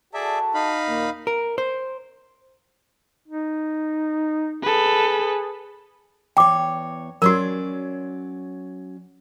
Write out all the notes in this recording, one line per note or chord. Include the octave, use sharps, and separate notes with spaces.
F#4 G#4 A4 D5 E5 A5
D#4 F5 B5
D#2 A#2 A#3
A#4
C5
D#4
G#4 A4 B4
E2 C#5 G5 D6
F#3 C#4 F#4 A#4 D5